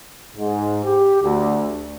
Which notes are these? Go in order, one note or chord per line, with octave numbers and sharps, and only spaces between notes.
G#2
G4
D2